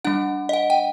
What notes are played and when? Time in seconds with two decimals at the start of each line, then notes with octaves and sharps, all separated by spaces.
0.05 G3 D4 F#5
0.49 D#5
0.53 F#5
0.70 G5